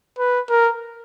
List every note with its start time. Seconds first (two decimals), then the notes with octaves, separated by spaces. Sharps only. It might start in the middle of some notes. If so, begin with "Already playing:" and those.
0.19 B4
0.50 A#4